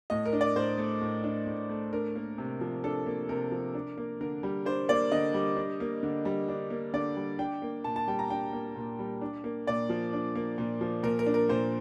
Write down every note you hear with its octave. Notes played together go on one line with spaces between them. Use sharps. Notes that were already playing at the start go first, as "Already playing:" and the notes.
A2 D#5
A#4
D4
D5
A2 C5
A3
A2
D4
A2
A3
D4 A#4
A#3
C3
F3
D4 A4
A#3
C3 A#4
F3
D4
A#3
D3 A#4
G3
D4 C5
A#3 D5
D3 D#5
G3
D4
A#3
D3
G3
D4
A#3
D3 D5
G3
D4 G5
A#3
A#2 A5
A5
G3 G5
A#5
D4 G5
A#3
A#2
G3
D4
A#3
A#2 D5
F3
D4
A#3
A#2
F3
A#2 A#4
A#4
D4
A#4
A#2 C5